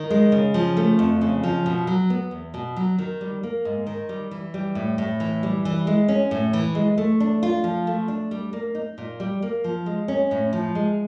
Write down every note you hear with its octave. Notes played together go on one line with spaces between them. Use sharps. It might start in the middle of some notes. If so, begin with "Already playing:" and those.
Already playing: D#3
G#3
C#3
F3
A3
F2
C#3
F3
B2
F#3
B3
E2
B2
F#3
D#3
G3
A#3
G#2
D#3
G3
E3
G3
A2
A2
E3
G3
E3
G#3
C#4
A2
E3
G#3
A3
D4
F4
F3
A3
D4
G3
A#3
D#4
A#2
G3
A#3
F3
G#3
C#4
A2
F3
G#3